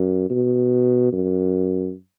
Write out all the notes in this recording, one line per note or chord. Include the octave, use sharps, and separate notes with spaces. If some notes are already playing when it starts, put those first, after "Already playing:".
Already playing: F#2
B2
F#2